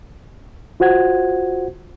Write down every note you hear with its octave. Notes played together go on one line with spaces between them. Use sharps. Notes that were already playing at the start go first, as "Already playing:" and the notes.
F4 F#4 C5 F#5 G#6